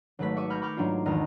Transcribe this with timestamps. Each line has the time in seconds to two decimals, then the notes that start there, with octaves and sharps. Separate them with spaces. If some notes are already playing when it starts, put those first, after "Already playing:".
0.19 G#1 F#3 A3 B4 B6
0.36 E5 C#6 D6 D#7
0.50 B5 F6 G6 G#6 A#6
0.62 B5 C#6 D6 F6 G6
0.77 G#2 F#3 A#3 D4 F4
1.06 G#1 E2 D#3 D#5 A5 F6